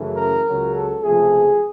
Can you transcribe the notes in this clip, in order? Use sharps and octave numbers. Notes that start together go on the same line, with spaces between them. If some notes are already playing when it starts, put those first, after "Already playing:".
Already playing: F#2 C#3 E3 A3
A#4
C#2 C#3 F#3
A4
C#2 C3 F3 A3 G#4